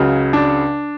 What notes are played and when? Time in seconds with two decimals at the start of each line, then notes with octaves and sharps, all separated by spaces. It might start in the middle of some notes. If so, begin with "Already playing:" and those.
Already playing: C#2 C#3 F#3
0.33 D4